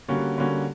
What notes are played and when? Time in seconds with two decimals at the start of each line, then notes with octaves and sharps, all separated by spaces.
0.08 D3 G3 A#3 C#4 F#4
0.38 D3 G3 A#3 C#4 F#4